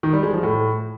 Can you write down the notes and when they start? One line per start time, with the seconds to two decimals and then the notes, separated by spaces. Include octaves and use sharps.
0.03 D#3
0.13 G3
0.23 G#3
0.33 F3
0.43 A2